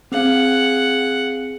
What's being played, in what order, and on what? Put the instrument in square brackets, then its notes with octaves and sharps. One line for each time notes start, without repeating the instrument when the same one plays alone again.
[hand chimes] C4 F5 [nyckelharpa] G#4 F#5